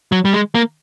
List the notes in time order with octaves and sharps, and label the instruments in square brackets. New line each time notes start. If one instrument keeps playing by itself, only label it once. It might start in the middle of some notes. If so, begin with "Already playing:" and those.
[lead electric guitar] F#3
G3
G#3
A#3